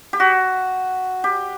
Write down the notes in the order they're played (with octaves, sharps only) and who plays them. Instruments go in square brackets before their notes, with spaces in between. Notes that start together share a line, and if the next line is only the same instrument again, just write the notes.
[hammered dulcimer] G4
F#4
G4